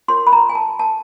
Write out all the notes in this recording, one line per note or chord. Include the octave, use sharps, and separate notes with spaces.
F4 A#4 C#5 C6
B5
A#5
G#5
A5
A5